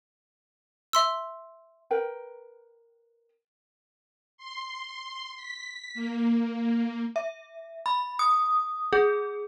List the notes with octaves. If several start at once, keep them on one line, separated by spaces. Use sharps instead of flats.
E5 C6 E6
A#4 B4 G5
C6
B6
A#3
E5
B5
D#6
G#4